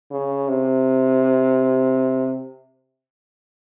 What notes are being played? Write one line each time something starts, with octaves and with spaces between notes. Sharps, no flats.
C#3
C3